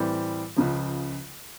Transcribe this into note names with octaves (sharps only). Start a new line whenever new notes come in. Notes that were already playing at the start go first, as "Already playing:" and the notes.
Already playing: A2 E3 G3 C4
C#2 C#3 F3